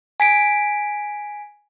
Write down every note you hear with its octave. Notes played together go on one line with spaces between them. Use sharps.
G#5 B6 D7